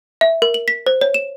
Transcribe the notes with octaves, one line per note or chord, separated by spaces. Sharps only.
E5
A#4
F#7
B6
C5
C#5
E7